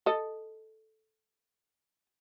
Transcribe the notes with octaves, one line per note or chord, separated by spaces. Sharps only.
A4 D#5